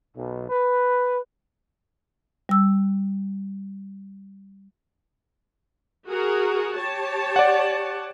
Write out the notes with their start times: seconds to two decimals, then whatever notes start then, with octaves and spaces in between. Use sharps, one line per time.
0.16 B1
0.50 B4
2.49 G3 E6
6.07 F#4 G#4 A#4
6.75 G4 C#5 A5
7.36 D5 F#5